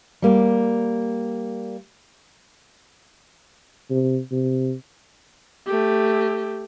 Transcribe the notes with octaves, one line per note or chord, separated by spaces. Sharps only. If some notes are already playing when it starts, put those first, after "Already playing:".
G3 A#3
C3
C3
A3 G4